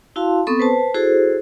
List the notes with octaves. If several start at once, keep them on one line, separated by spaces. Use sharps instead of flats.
E4 F#4 F5 A5 C6
B3 C4 A4 C6 C#6 D#6
B4 C5 A5
E4 F#4 G#4 A4 C5